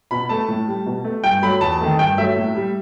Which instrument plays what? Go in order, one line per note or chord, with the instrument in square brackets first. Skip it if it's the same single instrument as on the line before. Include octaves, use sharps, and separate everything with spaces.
[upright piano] B2 B5
A3 A5
A2
G3
B2
A3
G2 G5
F#3 A3 B5
E2 A5
D#3 A3
G2 G5
F#3 A3 E5
A2
G3